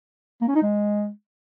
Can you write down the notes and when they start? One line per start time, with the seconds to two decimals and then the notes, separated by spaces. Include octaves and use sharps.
0.41 A#3
0.48 C#4
0.55 D#4
0.62 G#3